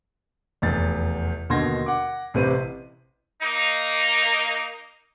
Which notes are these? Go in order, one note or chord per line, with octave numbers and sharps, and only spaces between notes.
F1 E2 A6
D#2 B2 D3 C6 G#6 A#6
F#5 D6
A1 C3 B4 C5 D#7
A#3 D#4